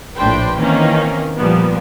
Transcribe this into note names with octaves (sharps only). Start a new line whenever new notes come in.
A#1 A2 D4 B4 C5 G5
D#3 E3 A#3 C4 C#4 D#4
A#2 F3 G3 B3